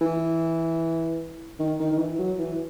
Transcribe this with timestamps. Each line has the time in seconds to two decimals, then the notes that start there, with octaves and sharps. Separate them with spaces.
0.01 E3
1.59 D#3
1.80 D#3
1.92 D#3
1.98 E3
2.19 F#3
2.39 E3